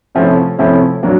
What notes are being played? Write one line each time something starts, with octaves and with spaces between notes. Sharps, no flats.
C3 F3 A3 C#4 E4
C3 F3 A3 C#4 E4
F#3 A#3 D4